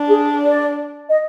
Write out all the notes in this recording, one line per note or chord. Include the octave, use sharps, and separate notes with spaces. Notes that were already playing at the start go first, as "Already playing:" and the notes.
Already playing: D4
G#4
D5
D#5